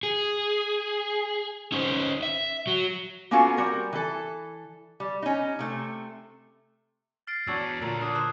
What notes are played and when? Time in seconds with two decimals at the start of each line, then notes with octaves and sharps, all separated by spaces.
0.03 G#4
1.72 C#4 D#4 C5
2.23 E5
2.67 F#3
3.31 A#3 B3 C#4 F4 F#4 A4
3.57 G3 C4 F#4 A#4
3.93 E3 A4
5.00 G3
5.22 C#4 D#4
5.59 C3 A3
7.27 F6 A6 C7 D7
7.47 E2 F#3 B3 D4 F#4 E6 G#6 D7
7.82 A#2 D3 F#4 A#5
8.01 D4 D#6
8.15 C5 F#6